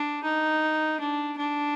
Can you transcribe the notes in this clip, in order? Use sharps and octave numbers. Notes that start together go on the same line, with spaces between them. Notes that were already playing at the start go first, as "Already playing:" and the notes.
Already playing: D4
D#4
D4
D4